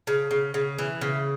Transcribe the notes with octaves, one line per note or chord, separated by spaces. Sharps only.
C#3
C#3
C#3
E3
C#3